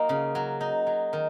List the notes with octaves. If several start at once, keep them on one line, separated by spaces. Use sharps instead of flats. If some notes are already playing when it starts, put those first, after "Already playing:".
Already playing: F#3 A#3 D#4
C#3
F#3
D#4
F#3
D#3